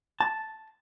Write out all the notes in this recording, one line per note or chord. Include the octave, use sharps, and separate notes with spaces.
A5